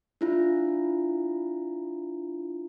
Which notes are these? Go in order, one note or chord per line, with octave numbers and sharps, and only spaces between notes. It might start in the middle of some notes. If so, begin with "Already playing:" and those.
D4 E4 F4